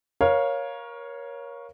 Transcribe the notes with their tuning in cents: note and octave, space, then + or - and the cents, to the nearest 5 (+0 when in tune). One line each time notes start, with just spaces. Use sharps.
A#4 +25 C#5 +0 F5 +0